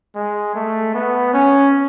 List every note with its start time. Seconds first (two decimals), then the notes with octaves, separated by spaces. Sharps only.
0.15 G#3
0.55 A3
0.94 B3
1.34 C#4